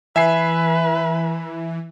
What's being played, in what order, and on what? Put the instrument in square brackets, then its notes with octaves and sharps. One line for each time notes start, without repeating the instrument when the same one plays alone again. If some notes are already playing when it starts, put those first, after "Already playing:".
[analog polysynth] E3 [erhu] B4 [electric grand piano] E5 G#5 C7